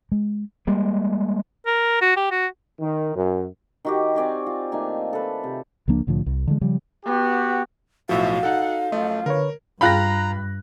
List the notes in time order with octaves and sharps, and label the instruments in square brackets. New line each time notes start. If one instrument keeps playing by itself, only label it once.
[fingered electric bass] G#3
[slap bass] G3 G#3 A#3
[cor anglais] A#4
F#4
G4
F#4
[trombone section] D#3
F#2
[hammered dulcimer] D#3 F#4 G4
C4 D5 G#5 D6
F4
D#3 A3 A#3 G#5
A4 B4
C3
[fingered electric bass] C#2 F3 A#3 D4
C2 A2 D3 F3
C2
D3 E3 G#3
C#3 F3 G3
[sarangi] B3 [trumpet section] F#4 G4
[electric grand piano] B1 A2 F3 [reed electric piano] F#4 [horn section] E5 [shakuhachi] F5
[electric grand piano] D#4 A4 [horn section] F#5
[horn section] F#2 F3 F4 [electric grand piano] A3 [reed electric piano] D#5
[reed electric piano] D3 B4 C#5 [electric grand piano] A#4
[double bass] G2 [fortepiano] F4 F5 G5 [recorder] A#5 [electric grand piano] B5 F#6 A#6